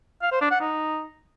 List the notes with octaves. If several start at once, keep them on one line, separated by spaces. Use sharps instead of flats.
F5
C5
D4
F#5
D#4